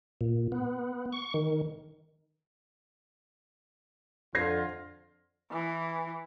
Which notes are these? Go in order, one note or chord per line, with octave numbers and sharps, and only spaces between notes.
A#2
B3
C#6
D#3
F2 D3 F4 G#6 A#6 C7
E3